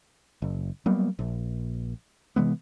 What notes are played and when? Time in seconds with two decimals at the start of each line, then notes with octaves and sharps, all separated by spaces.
0.42 F#1
0.86 F#3 G3 A#3 B3
1.19 A#1
2.36 C3 E3 G#3 B3